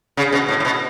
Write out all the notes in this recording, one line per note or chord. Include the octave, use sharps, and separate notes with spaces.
C#3
B2
A2
A2
B2